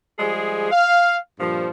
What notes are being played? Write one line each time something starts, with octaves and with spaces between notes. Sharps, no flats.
F3 G3 G#3 G#4
F5
G2 A#2 F3